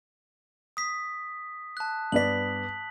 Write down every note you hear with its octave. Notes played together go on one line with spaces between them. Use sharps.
D#6 B6
A5 F#6
G2 B3 D5 B6 F#7